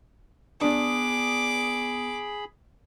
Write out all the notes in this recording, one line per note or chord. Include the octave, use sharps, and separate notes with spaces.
B3 D4 G#4 B5 D6 D#6